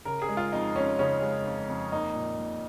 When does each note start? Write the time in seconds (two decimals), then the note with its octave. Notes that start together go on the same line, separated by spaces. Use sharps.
0.05 C#3 A#4
0.22 G#4
0.29 G#3
0.37 F4
0.52 F2 D#4
0.76 F2 C#4
0.99 C#3 C#4
1.22 G#3
1.45 F2
1.68 F2
1.92 A#3 D#4
2.15 A#2
2.38 A#2